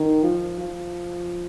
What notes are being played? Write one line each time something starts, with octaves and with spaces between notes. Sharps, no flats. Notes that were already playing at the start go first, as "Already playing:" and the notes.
Already playing: D#3
F3
F3